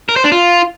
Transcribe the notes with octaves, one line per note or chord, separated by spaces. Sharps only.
A#4
C5
D4
F4